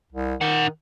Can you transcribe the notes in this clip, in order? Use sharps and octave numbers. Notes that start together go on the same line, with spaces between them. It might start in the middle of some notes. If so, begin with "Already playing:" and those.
C2
D#3 D#4 F#5